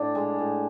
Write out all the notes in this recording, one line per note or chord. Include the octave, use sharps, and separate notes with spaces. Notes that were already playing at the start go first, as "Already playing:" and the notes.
Already playing: A2 D4
G#3
A2